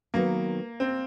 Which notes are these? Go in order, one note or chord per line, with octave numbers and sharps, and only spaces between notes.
D#3 F#3 A#3 B3
C4